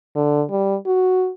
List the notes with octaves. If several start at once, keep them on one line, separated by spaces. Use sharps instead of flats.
D3
G3
F#4